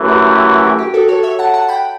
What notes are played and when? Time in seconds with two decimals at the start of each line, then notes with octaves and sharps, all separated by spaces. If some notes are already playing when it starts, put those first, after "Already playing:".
Already playing: F#2 E3 A3
0.08 G4 B4
0.28 G4
0.48 F#4
0.58 G4
0.63 F#4
0.79 G4
0.94 F#4 A4
1.08 A4 C#5
1.23 C#5 E5
1.39 F#5 A5
1.54 F#5 A5
1.68 G5 B5